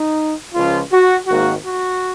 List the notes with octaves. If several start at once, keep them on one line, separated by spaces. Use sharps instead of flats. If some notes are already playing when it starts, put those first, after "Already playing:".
Already playing: D#4
C#2 C#3 F3 F4
F#4
G#1 G#2 D#3 A#3 F#4
F#4